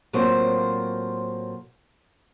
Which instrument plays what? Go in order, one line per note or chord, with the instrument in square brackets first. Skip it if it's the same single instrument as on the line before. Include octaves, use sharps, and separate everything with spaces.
[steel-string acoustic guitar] A2 F#3 A#3 C4 F4 C5